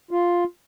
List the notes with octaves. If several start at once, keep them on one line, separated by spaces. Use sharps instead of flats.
F4